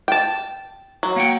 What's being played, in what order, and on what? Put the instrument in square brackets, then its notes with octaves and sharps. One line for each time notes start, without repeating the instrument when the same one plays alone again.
[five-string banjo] G5 A5
F#3
[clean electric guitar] A#3 F#5 G5